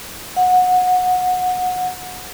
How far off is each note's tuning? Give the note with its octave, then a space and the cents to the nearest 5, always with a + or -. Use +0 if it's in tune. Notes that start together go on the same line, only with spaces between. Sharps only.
F#5 -20